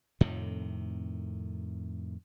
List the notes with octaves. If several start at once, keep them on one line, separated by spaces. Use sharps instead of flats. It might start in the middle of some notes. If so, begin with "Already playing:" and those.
F2 A2 C3 D#3